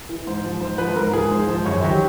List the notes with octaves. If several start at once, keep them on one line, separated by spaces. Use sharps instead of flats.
E3
G#2 C5
F3
G#2 C5
F3 B4
G#2 A#4
F3 G#4
G#2 C5
F3 C5
F#2 C#5
D#3 F#3 G4